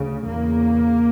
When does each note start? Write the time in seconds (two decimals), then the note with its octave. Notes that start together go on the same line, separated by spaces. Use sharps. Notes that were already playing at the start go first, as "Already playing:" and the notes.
Already playing: D2 C#3
0.26 E2 C#3 A#3